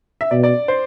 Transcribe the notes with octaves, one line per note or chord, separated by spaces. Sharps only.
E5
B2 D5
D5
C5